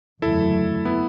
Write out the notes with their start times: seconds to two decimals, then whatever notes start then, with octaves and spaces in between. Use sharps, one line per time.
0.22 F#1 E2 D3 F#3 A3 E4 A4
0.85 B3 E4